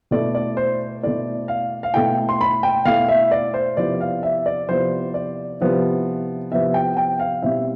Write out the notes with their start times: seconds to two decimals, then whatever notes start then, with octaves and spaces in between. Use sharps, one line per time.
0.11 B2 A3 E4 D5
0.35 D5
0.57 C5
1.03 B2 A3 E4 D5
1.48 F5
1.83 F5
1.94 B2 A3 E4 G5
2.29 C6
2.41 B5
2.63 G5
2.85 B2 A3 E4 F5
3.08 E5
3.31 D5
3.54 C5
3.77 C3 F3 B3 E4 D5
4.01 F5
4.23 E5
4.46 D5
4.68 C3 F3 B3 E4 C5
5.14 D5
5.61 C3 F3 B3 E4
6.51 C3 F3 B3 E4 E5
6.74 G5
6.97 G5
7.19 F5
7.42 B2 G3 C4 E4 E5